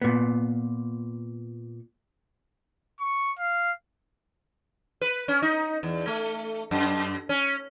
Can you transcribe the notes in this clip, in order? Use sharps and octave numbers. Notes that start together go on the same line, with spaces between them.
A#2 B3
C#6
F5
B4
C#4
D#4
E2
A3
F#2
C#4